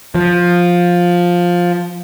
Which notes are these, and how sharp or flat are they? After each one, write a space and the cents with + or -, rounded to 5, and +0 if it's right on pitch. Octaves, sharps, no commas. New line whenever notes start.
F3 +10